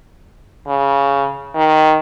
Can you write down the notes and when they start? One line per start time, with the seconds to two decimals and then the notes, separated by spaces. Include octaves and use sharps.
0.68 C#3
1.55 D#3